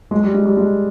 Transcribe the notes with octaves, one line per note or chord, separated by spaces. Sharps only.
G#3
G3
G#3
G3
G#3